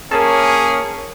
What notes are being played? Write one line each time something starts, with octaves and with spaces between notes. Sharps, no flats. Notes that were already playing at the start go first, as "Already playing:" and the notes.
A#3 C#4 G#4 A#4 C#5 A5